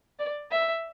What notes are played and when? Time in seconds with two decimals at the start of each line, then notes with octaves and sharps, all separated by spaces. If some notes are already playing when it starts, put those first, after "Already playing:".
0.19 D5
0.51 E5